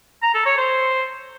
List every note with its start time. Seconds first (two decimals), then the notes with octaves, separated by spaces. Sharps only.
0.22 A#5
0.34 A4
0.46 C#5
0.57 C5